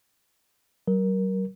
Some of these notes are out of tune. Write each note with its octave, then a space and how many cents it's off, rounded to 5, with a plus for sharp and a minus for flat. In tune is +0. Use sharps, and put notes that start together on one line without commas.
F#3 +45 A#4 +15